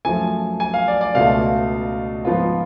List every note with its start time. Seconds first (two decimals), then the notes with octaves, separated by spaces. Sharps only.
0.05 F#2 F3 A3 G#5
0.60 G#5
0.74 F5
0.88 D5
1.01 D5
1.15 C#2 B2 A3 F4 F5
2.25 G#2 F3 B3 F4